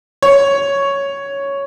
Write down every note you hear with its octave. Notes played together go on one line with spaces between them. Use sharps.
C#5